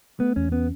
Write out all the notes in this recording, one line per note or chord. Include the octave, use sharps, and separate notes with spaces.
A3 B3
E2 C#4
B3 C#4